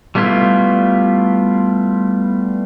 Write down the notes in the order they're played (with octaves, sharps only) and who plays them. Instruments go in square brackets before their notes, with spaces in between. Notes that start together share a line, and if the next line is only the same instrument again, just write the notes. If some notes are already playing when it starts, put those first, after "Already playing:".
[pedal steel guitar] G3 A3 B3 E4 F4